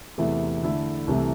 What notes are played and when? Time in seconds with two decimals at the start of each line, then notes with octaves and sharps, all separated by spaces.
0.18 E2 C3 E3 A3 E4
0.62 D3 A3 E4
1.07 C2 C3 E3 A3